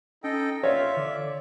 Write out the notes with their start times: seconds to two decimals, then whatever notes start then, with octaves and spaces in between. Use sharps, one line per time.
0.24 C#4 D#4 A4 D#5 G5
0.63 F4 C#5 D5 E5
0.97 D3 D5